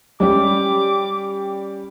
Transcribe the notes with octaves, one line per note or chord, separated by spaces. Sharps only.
G3 C#4 G4 D6